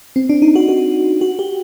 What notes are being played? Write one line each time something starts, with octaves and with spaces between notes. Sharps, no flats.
C4
D4
D#4
F#4
F#4
F#4
G4